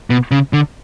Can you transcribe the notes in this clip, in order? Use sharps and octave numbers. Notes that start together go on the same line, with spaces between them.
B2
C#3
D3